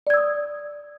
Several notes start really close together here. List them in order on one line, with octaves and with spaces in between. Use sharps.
D5 G#6 E6 D#6